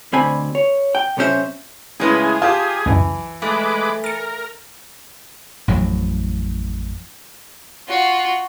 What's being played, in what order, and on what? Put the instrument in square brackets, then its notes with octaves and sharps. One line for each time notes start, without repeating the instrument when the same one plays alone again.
[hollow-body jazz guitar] D2 B2 C4 D5 G#5 B5
C#5
G5
B1 C3 C#4 D4 C5 E5
[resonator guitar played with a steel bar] A2 G#3 E4 [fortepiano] C#3 B4 [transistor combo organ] G#4
[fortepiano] F4 G4 [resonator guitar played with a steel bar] A5
[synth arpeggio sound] C#2 F#2 [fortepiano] E3
[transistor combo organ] G#3 B4 D6 [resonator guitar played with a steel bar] A3
[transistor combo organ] A#4 [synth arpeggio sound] A6 C#7
[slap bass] A1 F2 F#3
[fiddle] F4 F#4